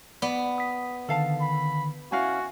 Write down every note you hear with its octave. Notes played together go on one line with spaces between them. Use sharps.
B3 D5
D#6 B6
D3 D#3 A4 F5 A5
B5
C#4 E4 F#4 F5 G#5